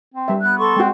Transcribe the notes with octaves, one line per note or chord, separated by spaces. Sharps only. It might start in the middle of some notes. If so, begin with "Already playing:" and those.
C4
G3 E5
B3 F#6
A4 C6 C#6
G#3 C4 F#4